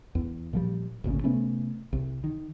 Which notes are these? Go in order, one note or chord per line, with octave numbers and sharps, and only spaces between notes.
E2
A#2 F3 G3
G#1 D2 A#2 C#3
C3 A3 B3 C#4
C2
D#3